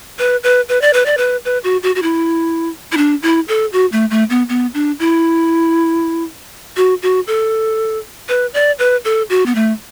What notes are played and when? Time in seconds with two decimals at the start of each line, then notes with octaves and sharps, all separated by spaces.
0.19 B4
0.44 B4
0.69 B4
0.82 D5
0.93 B4
1.06 D5
1.18 B4
1.45 B4
1.64 F#4
1.83 F#4
1.95 F#4
2.02 E4
2.92 E4
2.97 D4
3.22 E4
3.48 A4
3.73 F#4
3.92 A3
4.11 A3
4.30 B3
4.49 B3
4.74 D4
5.00 E4
6.77 F#4
7.02 F#4
7.27 A4
8.29 B4
8.54 D5
8.79 B4
9.05 A4
9.30 F#4
9.46 B3
9.55 A3